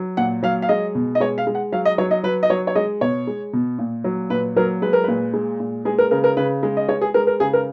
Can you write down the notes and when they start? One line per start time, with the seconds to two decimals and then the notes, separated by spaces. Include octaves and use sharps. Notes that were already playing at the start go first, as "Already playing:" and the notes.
Already playing: F#3
0.17 A#2 F#5
0.43 F#3 F5
0.62 F5
0.69 G#3 D#5
0.95 B2
1.15 D#5
1.20 G#3 C#5
1.38 F5
1.47 G#3
1.55 F#5
1.72 F#3 F5
1.85 D#5
1.98 F#3 C#5
2.11 D#5
2.24 F#3 B4
2.43 D#5
2.50 F#3 C#5
2.67 C#5
2.75 G#3 D#5
3.01 B2 C#5
3.27 G#3
3.53 B2
3.79 A#2
4.04 F#3
4.30 A#2 B4
4.56 F#3 A#4
4.82 G#3 B4
4.93 A#4
5.04 A#2 B4
5.34 G#3
5.60 A#2
5.85 G#3 G#4
5.98 A#4
6.11 C#3 A#4
6.24 A#4
6.37 C#3 B4
6.63 G#3
6.77 D#5
6.89 G#3 C#5
7.01 G#4
7.14 G#3 A#4
7.27 A#4
7.40 C#3 G#4
7.53 A#4